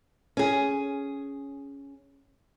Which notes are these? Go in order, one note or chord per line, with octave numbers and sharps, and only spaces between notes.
C#4 G#4